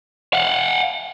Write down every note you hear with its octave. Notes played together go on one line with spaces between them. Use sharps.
F5 F#5